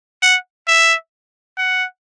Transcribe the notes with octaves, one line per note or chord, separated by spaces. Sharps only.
F#5
E5
F#5